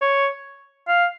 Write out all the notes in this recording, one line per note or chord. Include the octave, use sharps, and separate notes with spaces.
C#5
F5